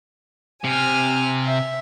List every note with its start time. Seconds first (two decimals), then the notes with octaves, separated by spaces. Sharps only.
0.64 C3 G#5 F6
1.44 E5